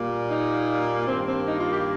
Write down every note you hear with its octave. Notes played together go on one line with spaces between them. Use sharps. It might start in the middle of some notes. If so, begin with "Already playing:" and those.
Already playing: A#2 G3 A#3
D#4
G2 D#3 A#3 C4
C4
D#4
F4
G4